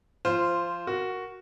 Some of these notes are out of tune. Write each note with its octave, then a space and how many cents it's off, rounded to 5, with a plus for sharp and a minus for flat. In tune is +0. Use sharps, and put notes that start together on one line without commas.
F3 -20 F4 -15 C5 +0
F#4 +0 A#4 +0